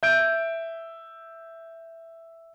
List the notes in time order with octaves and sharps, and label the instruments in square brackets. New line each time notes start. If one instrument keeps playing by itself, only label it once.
[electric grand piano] E5 G6 D7